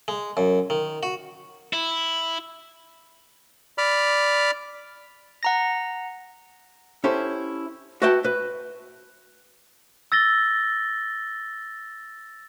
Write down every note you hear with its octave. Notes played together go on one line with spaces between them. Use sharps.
G#3
F#2
D#3
F#4
E4
D5 B5 F6
F#5 A#5 A#6
C#4 E4 G4 A4 C5
F#4 B4 E5 F#5 G5 A5
B4
E6 A6 A#6 G7